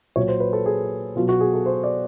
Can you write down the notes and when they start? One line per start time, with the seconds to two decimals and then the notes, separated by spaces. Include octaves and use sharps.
0.16 A#2 F#3 C#5
0.28 C5
0.40 B4
0.53 A4
0.66 G#4
1.16 B2 F#3 F4
1.29 F#4
1.40 G#4
1.54 A4
1.66 C5
1.84 D5